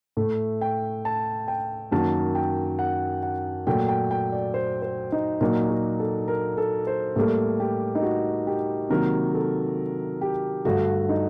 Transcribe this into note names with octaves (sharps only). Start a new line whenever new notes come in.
A2 A3
G5
A5
G5
F#2 D#3 F#3 A#3 A5
G5
F#5
F#5
A#2 F#3 A3 G5
G5
G5
D5
C5
C5
D#4
A#2 F#3 A#3 D#4
F#4
A4
A#4
A4
C5
A2 G3 A#3 A4
G4
D#4
F#4
G4
C3 D#3 F#3 A#3 A#4
A4
G4
G2 D3 A3 F#4
D#4